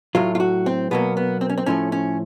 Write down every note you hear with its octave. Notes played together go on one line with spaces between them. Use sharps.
A2 F#3 A3 F4
F4
F#4
C4
B2 F#3 A#3 B3
B3
C4
C#4
C4
A2 F3 A3 C#4
C#4